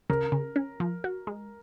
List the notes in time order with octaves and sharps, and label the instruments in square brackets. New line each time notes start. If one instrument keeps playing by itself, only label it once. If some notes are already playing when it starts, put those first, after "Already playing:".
[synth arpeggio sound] C#3 [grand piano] A#4
[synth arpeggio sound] C#3
C#4
F3
F#4
G#3